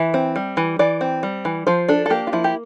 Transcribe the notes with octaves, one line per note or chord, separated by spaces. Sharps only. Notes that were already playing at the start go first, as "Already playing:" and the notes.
Already playing: E3 E5
C4
G3
E3
E3 D5
C4
G3
E3
F3 C5
D4 A4
A4
A#3 G4
F4
F3 E4
G4